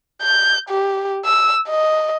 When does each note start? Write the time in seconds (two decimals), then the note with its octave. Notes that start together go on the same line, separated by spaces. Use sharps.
0.22 G6
0.70 G4
1.25 E6
1.68 D#5